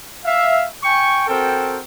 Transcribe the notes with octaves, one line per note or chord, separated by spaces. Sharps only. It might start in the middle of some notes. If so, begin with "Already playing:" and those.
E5 F5
G5 G#5 C#6
C4 F#4 A4 A#4 G5